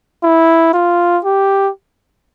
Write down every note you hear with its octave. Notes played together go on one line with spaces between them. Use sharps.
E4
F4
G4